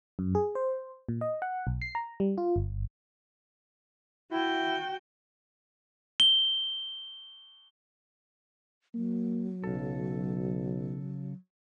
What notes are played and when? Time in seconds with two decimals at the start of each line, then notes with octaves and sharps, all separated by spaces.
0.19 F#2
0.35 G#4
0.55 C5
1.09 A#2
1.21 D#5
1.42 F#5
1.67 B1
1.82 C7
1.95 A#5
2.20 G3
2.38 F4
2.56 G1
4.31 E4 F#4 G5
6.20 G7
8.95 F#3 A#3
9.64 B1 C#3 A4